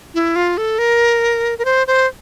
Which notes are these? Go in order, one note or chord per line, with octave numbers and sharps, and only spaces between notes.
E4
F4
A4
A#4
A#4
C5
C5